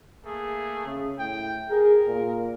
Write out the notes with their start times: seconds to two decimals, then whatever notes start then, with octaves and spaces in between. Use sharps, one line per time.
0.24 A3 A#3 G#4
0.86 C#3
1.19 A2 G5
1.70 G#4 A#4
2.07 A#2